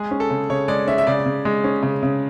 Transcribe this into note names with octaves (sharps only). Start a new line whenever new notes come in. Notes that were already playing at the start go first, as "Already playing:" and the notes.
Already playing: G#3 G#4
C#4
A4
C#3
C#3 C#5
G#3 D5
C#4 E5
E5
C#3 D5
C#3
G#3
C#4
C#3
C#3